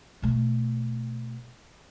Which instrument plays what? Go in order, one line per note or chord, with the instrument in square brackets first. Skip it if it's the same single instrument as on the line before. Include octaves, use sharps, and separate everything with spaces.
[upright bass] B2 A3